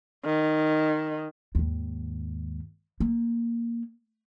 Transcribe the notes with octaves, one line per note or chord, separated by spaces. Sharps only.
D#3
D#2 G#2
A#3